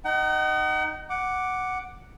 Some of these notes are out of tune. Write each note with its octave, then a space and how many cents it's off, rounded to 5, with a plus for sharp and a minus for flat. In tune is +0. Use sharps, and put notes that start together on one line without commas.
D#4 -10 F#5 +40
F#5 +0 D6 +0